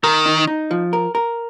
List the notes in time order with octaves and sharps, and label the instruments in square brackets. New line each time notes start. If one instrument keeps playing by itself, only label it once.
[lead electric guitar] D#3 [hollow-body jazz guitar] A#4
[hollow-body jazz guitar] D#4
D#4
F3
A#4
A#4